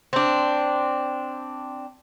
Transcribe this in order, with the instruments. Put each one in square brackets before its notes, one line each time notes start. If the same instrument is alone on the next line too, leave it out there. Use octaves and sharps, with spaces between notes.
[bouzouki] C4 D4